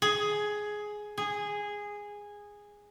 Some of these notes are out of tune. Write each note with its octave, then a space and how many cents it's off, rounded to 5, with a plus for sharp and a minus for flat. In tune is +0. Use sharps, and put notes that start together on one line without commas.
G#4 +10
G#4 -10